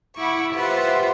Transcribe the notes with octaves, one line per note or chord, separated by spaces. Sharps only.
E4 F#5 B5 C#6 D6
F4 G4 B4 C5 E5 F#5